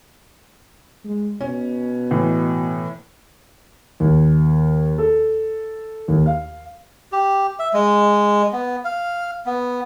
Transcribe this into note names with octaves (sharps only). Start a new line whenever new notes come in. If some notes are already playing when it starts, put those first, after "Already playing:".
G#3
B2 C#4
A2 E3
D#2
A4
D#2
F5
G4
E5
G#3
B3
F5
B3